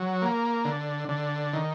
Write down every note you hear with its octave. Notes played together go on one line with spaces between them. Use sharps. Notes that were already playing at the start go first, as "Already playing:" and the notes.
Already playing: F#3
A#3
D3
D3
D#3